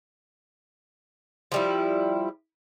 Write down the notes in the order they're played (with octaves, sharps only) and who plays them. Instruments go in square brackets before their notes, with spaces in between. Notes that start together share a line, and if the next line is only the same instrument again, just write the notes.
[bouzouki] F3 G3 E4